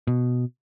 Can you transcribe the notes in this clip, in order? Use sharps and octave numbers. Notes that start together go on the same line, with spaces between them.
B2